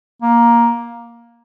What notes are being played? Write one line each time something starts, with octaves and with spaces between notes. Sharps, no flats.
A#3